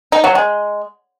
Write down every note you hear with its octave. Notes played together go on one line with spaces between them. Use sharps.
D#4
F#3
G#3